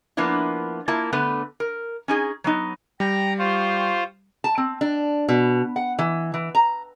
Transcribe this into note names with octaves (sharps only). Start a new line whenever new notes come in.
F3 A#3 B3 D4 E4
A#3 E4 F4 A5
D3 A3 B3 B4
A#4
C#4 D#4 G#4
F#3 B3 D#4
G3 G5 A#5
F4 G4 C5 G5 C#6
A5
C4
D4
B2
F#5
E3
E3
A#5